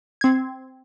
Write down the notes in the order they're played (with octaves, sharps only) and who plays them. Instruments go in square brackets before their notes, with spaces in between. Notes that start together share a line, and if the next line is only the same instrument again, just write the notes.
[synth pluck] C4 G#6